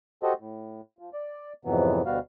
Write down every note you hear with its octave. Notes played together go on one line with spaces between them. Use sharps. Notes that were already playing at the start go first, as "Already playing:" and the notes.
F#4 G4 A4 C5 D#5
A2
F3
D5
F2 G#2 C3 E3 F#3 B3
D2 B2 G3 B3 F#4 F5